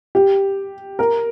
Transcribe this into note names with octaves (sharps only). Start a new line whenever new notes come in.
G4
A#4